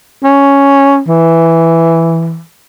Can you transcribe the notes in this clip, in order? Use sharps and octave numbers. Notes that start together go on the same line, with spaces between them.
C#4
E3